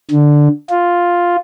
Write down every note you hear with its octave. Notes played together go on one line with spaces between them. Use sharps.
D3
F4